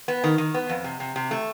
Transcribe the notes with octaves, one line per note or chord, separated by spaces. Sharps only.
B3
D#3
D#3
B3
F2
C3
C3
C3
A3